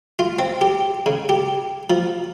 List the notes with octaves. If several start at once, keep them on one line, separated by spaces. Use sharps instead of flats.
F4
C4
G4
C#3
G4
F3